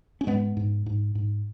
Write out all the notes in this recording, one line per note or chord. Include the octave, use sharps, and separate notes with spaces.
C#4
G#2 G#3 B3
G#2
G#2
G#2